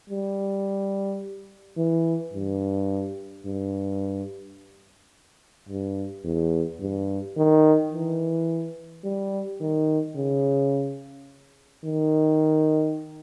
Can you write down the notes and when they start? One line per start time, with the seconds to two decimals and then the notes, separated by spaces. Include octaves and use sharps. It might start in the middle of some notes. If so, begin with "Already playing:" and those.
0.10 G3
1.77 E3
2.33 G2
3.46 G2
5.69 G2
6.24 E2
6.80 G2
7.37 D#3
7.92 E3
9.04 G3
9.60 D#3
10.16 C#3
11.84 D#3